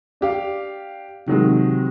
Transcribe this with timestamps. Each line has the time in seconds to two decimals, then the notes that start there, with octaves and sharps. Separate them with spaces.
0.21 D4 G4 F5
1.28 C3 D#3 F#3 G#3